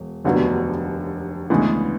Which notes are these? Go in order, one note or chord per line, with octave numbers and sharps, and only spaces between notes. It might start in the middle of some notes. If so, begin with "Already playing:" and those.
Already playing: E1
F1 D#2 D3 F#3 B3
D2 C#3 E3 G#3 B3